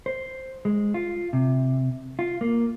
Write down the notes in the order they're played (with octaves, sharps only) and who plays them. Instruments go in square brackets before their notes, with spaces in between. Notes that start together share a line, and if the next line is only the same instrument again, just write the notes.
[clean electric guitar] C5
G#3
F4
C3
F4
A#3